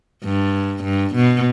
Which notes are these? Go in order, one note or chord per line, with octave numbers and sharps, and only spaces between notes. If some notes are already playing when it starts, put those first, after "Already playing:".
G2
G2
B2